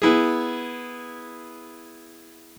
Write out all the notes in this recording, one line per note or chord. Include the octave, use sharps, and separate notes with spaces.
B3 E4 G#4